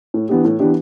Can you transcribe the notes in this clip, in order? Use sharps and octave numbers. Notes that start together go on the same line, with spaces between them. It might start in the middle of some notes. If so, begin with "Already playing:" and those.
A2
E3 B3 D4 G4
A2
E3 B3 D4 G4